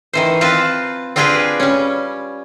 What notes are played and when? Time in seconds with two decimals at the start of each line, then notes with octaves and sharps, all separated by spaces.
0.13 D#3 E3 C5
0.41 C4 F4 B4 F5 A5
1.16 C4 D4 F4 G4 G#4 B4
1.60 G3 C#4